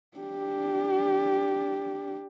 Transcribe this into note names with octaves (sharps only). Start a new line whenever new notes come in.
D4 G4